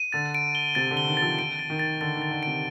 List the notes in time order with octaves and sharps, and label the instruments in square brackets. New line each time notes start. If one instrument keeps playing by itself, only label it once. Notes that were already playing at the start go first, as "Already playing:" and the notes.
Already playing: [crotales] D#7
[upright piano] D3 [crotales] A6
[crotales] D7
G7
[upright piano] C3 [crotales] A6
[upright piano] D3
[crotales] G7
[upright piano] D#3
[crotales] A6
[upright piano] F3
[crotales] D7
A6
[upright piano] D#3
[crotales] A6
[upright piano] D3 [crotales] A6
[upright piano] D#3
[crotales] A6
[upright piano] D3
[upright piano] C3 [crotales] D7